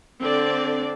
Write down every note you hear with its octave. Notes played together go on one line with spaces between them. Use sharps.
D3 C4 D5